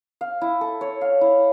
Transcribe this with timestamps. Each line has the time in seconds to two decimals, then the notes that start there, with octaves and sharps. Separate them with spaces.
0.21 F5
0.41 E4
0.61 A4
0.81 C#5
1.01 F5
1.21 E4